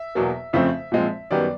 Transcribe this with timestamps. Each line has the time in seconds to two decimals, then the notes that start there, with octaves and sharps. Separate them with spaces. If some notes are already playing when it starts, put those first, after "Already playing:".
Already playing: E5
0.15 E2 B2 F#3 A#3
0.53 F2 C#3 F3 A3 C4 E5
0.92 A#2 F3 G#3 C4
1.31 F#2 D#3 G3 B3 D5